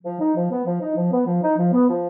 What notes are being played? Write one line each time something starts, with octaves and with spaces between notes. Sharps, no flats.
F3
D#4
F3
B3
F3
D#4
F3
B3
F3
D#4
F3
B3
F3